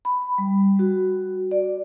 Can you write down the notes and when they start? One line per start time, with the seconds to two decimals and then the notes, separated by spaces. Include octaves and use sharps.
0.05 B5
0.38 G3
0.79 F#4
1.51 D5